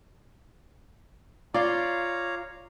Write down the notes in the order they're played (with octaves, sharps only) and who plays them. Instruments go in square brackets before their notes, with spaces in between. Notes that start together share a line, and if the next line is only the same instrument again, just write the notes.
[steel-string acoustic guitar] F4 [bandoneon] C#5 F5 A#5 [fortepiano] D5 D6